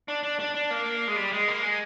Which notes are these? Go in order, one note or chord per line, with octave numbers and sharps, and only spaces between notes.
D4
D4
D4
D4
A#3
G#3
G3
G#3
A#3
G#3